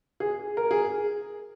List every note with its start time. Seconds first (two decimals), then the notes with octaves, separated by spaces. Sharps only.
0.20 G#4
0.57 A#4
0.71 G#4